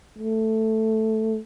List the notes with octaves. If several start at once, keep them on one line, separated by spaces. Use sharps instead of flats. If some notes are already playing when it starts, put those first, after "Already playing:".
A3